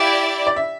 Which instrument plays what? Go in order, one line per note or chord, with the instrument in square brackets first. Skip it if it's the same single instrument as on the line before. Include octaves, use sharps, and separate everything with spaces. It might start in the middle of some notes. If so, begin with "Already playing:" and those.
Already playing: [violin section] E4 G4 D5 [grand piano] F5
[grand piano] D5
E5